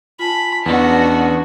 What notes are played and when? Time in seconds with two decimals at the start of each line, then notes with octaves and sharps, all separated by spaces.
0.19 F4 G#5 A5 B5
0.66 E2 C#4 D4 F#4 B4 D#5